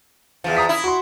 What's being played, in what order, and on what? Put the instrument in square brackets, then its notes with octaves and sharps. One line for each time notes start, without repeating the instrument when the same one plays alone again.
[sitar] E2 F3
[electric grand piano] A#5 D#6 B6
[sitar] E4
[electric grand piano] F#4 C6